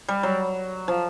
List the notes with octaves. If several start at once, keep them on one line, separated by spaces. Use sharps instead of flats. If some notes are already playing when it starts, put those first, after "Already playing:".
G3
F#3
F3